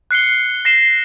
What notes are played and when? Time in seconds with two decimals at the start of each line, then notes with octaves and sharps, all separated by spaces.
0.11 F#6 C7 C#7 G7
0.65 A#6 C7 E7 G7